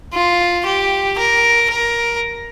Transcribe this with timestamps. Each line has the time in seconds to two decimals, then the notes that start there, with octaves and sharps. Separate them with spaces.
0.14 F4
0.66 G4
1.18 A#4
1.71 A#4